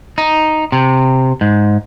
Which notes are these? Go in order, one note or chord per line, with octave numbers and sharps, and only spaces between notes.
D#4
C3
G#2